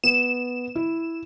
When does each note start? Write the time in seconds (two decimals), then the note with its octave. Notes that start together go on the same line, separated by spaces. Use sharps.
0.04 B3 E7
0.76 E4